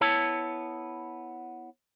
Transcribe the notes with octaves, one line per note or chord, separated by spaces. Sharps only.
B3 E4 C#5 A5